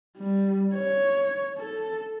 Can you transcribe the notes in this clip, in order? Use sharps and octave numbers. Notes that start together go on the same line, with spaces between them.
G3
C#5
A4